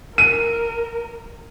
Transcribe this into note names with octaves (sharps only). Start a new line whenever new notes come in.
A#4 D#7